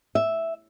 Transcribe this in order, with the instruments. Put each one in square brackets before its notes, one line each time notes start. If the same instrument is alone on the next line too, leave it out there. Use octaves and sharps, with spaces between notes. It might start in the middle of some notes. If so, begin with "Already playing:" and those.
[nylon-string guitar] E5